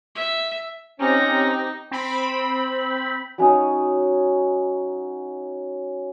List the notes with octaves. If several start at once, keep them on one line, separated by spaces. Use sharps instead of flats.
E5
C4 C#4 D#4 G4 A#5 A#6
C4 B5
F#3 C#4 D#4 D#6